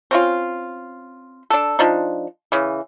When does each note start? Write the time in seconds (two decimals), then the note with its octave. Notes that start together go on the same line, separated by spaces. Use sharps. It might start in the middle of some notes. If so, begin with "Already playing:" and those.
0.11 C4 C#4 F4
1.50 D4 A4
1.79 F3 D4 D#4
2.52 C#3 E3